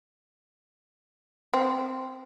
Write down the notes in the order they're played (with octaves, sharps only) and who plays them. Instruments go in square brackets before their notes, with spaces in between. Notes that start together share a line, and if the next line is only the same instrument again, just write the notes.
[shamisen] C4